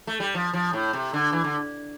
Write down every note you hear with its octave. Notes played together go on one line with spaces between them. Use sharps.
A3
G3
F3
F3
A2
C3
D3
E3
D3